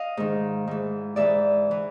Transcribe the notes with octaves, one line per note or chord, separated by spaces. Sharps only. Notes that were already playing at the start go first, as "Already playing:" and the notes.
Already playing: D#5 F5
G#2 D#3
G#2 E3
G#2 E3 D5 E5
E3